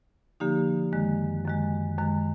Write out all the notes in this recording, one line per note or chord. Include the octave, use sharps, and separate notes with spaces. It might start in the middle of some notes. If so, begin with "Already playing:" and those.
D3 F3 A#3 D#4 G4
F#2 D#3 G#3
F#2 D#3 G#3
F#2 D#3 G#3